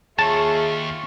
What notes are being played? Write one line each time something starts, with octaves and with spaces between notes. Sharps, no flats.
D#2 F4 G#4 C#5 E5 A5 C#6